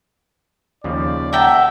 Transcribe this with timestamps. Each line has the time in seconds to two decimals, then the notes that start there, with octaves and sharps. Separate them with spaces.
0.84 D#2 C#3 F3 D5
1.33 A#4 E5 F#5 G5 A5